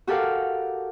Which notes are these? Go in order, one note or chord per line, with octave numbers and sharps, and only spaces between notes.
F#4 G4 A4 A#4 F5 F#5